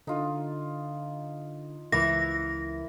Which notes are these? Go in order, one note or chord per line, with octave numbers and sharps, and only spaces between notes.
D3 D#4 F4
C#2 E3 E4 A#4 D6 A#6